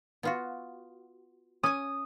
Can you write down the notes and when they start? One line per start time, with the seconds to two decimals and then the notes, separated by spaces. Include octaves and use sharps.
0.23 B3 F4 F#4
1.63 C#4 G#5 D#6